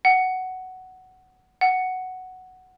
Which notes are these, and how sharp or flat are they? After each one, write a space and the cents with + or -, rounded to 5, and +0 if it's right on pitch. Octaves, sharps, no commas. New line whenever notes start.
F#5 +10
F#5 +5